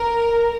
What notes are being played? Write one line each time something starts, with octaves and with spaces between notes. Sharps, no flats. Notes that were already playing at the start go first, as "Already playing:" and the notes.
Already playing: A#4